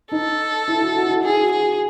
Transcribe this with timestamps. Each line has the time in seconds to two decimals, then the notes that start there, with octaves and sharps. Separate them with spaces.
0.12 D#4 A4
0.68 E4
0.82 F#4
0.96 F#4
1.03 E4
1.09 F#4
1.24 E4 G#4
1.42 F#4
1.51 G#4
1.61 F#4